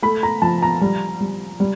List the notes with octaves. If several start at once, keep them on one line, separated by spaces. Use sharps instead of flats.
A3 B5
A#5
F3 A5
A#5
G3
G3
G3